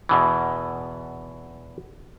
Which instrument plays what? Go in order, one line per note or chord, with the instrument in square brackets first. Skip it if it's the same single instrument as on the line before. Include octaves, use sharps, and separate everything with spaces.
[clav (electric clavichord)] E2 B2 E3